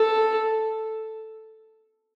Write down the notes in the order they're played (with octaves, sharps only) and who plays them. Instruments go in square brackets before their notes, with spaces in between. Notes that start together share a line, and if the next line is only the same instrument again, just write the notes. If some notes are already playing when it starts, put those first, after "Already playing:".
Already playing: [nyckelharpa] A4